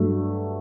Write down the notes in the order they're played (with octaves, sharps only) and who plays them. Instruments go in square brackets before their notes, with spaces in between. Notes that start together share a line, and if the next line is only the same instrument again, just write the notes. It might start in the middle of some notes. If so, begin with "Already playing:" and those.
Already playing: [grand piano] G2 F#3 A3